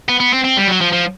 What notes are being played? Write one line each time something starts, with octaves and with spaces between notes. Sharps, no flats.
B3
B3
C4
C4
G3
F#3
F3
F3